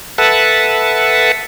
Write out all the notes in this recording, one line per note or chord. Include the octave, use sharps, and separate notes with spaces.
A4 B4 E5 F#5 A5